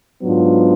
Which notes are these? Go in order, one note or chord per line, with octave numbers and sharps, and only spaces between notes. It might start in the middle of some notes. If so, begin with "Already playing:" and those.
G#2 F#3 B3 D4 F4